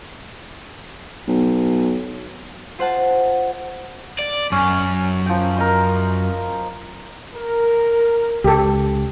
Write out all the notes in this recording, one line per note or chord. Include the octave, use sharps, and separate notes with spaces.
B1
F4 C5 F#5 A5
D5
F#2 C#4 G#5
F3 G5
A#4 D#5 C6
A#4
C#2 G4 A4